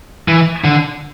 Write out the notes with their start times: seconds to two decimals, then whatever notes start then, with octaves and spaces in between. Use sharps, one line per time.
0.28 E3
0.64 D3